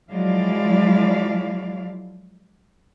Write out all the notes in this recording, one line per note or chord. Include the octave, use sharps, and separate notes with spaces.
F3 F#3 G#3 E4 D5 F5